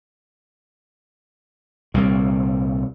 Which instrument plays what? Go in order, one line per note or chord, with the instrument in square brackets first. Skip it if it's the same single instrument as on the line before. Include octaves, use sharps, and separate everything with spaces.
[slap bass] C2 A#2